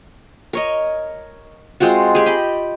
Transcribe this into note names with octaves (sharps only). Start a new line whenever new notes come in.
A#4 C#5 D#5
G#3 C4 F4 F#4
G4 G#4
D#5 G5 B5